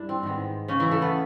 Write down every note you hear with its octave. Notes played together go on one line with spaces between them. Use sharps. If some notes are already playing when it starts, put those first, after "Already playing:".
Already playing: G2 D4 E4
C4
G#2 D#3 G#3 B3
C#3 C#4
E3 E4
A3 A4
B3 B4